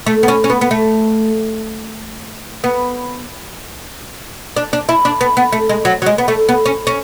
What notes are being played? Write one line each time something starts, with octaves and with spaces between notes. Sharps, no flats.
A3
B3
C#4
C#4
B3
B3
A3
B3
D4
D4
E4
D4
B3
B3
A3
G#3
F#3
F#3
G#3
B3
A3
B3
C#4
C#4